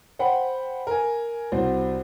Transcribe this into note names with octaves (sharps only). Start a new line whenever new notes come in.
C5 F#5 G5 B5
A#4 G#5
C2 F#4 C5